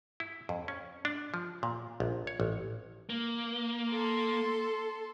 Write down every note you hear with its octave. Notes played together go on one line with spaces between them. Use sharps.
E4
F2
C#4
D4
F3
A#2
A#1
C#5
A1
A#3
A4 C6